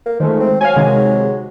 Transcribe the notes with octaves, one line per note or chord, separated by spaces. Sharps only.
A#3
D#3 F3 G#3 A3
C4
F#3 F5 G#5
C3 D#3 G#3